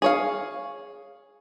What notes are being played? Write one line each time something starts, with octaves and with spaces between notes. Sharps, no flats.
G#4 C#5 F5